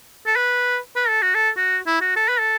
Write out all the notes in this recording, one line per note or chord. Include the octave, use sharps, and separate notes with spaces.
A4
B4
B4
A4
F#4
A4
F#4
E4
F#4
A4
B4
A4